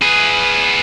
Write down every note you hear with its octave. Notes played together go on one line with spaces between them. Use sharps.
G#4 B4